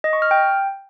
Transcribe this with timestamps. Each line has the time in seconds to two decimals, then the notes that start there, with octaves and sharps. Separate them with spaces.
0.04 D#5
0.13 C#6
0.22 F6
0.31 G5